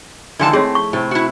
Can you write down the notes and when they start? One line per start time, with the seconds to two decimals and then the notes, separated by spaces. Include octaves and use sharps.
0.39 D3 D#3 F3 G#3 E4 A5
0.53 A3 C4 G#4 C#5
0.75 C#6
0.93 A2 C3
1.11 E4 F#4